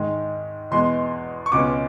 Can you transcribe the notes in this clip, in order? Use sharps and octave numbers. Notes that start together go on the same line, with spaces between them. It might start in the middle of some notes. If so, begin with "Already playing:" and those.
Already playing: G#2 D#3 G#3
E2 B2 G#3 B3 C6
C#6
C#2 B2 G#3 C#4 D6